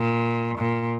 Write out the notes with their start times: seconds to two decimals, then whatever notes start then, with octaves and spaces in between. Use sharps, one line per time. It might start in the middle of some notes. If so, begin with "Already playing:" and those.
Already playing: A#2
0.58 A#2